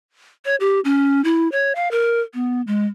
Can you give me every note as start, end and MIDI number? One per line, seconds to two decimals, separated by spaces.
0.45 0.56 73
0.60 0.80 67
0.85 1.23 61
1.24 1.50 64
1.52 1.73 73
1.75 1.91 77
1.91 2.21 70
2.34 2.61 59
2.67 2.85 56